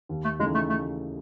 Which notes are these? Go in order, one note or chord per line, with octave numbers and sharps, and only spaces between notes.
D#2
A3
C#3 E3 G#3 A3 D#4
A3
A3